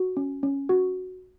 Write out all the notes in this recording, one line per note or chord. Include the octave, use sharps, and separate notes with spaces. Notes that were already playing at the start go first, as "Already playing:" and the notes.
Already playing: F#4
C#4
C#4
F#4